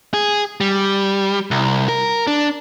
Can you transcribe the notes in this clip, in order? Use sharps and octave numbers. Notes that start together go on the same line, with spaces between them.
G#4
G3
C2
A#4
D4